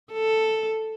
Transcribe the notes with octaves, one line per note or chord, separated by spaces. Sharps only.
A4